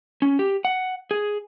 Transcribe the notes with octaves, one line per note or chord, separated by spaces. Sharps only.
C#4
G4
F#5
G#4